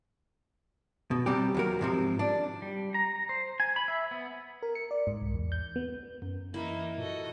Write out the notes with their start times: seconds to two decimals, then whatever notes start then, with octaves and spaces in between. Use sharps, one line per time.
1.11 B2
1.26 C3 G3 G4
1.54 D#2 F#3 A#4
1.81 G#2 C3 F3
2.19 D4
2.62 G3
2.94 A#5
3.29 C5
3.60 G#5
3.76 B5
3.88 E5
4.11 B3
4.63 A#4
4.75 C#7
4.91 D5
5.07 G#2
5.21 C2
5.34 E2
5.52 G6
5.76 B3
6.22 F#2
6.54 E3 A#3 D#4 E4
6.98 A#2 F#4 A4 D#5